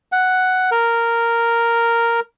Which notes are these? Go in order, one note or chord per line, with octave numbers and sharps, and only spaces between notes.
F#5
A#4